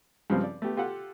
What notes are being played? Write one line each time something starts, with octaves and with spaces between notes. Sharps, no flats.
G2 C#3 F3 G3 G#3 C4
D5
A3 B3 G4
F4 G4 A4 F#5